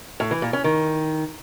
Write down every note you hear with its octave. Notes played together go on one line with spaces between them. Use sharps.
A2
E3
A#2
C#4
D#3